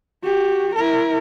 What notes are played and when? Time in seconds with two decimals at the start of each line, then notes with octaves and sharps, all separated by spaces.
0.23 F#4 G4
0.75 E4 A#4